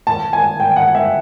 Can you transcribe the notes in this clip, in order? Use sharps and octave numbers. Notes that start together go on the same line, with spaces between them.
A5
G#5
G5
F#5
E5